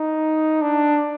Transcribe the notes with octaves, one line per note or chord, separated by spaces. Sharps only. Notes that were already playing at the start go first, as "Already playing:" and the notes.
Already playing: D#4
D4